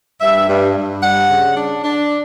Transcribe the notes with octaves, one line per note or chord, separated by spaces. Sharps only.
G2 E5
G2
G2
G3 F#5
C#3
D4
D4